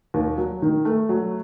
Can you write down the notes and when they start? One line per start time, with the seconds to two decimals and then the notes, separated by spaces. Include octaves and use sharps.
0.14 D#2
0.37 F#3
0.62 D#3
0.85 A3
1.09 F#3